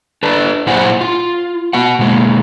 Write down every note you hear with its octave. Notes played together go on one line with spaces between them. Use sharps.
D4 A4 B4
A#2 F#3 E4 C5 F#5 G#5
F4
B3 F#4 F#5
B2 G#3 A#3